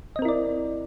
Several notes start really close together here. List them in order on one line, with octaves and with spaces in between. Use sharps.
D#5 C4 A#4 E4 D5